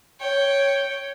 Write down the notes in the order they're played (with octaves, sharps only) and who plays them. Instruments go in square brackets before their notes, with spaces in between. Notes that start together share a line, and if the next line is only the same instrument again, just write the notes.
[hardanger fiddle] C#5 G5